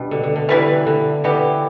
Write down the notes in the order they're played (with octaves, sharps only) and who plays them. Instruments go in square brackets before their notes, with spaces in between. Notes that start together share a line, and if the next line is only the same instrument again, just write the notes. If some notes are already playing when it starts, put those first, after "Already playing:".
Already playing: [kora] B2 [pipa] G3 D4
[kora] D3
D3
D3
[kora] D3 [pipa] E3 G3 E4 B4
[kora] D3
[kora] D3 [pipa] E3 B3 G4